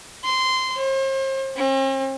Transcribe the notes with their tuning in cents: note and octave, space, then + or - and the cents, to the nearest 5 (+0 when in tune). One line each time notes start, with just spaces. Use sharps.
C6 -15
C5 +40
C4 +45